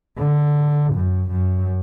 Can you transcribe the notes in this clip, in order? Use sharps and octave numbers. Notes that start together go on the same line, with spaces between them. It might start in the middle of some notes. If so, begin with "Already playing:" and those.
D3
F#2
F#2